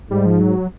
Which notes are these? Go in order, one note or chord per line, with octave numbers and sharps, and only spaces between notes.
G#2 G3
F3
F#3